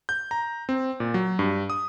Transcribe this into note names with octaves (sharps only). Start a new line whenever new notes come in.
G6
A#5
C4
A#2
F#3
G2
D#6